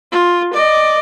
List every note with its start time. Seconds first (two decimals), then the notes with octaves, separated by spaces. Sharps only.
0.12 F4
0.53 D5 D#5